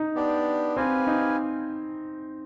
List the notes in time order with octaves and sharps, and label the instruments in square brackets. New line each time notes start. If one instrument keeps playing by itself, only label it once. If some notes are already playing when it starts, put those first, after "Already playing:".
Already playing: [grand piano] D#4
[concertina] B3 D4 G4 D5
[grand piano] C4 [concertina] G4 B4 F5 G#5
[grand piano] D#4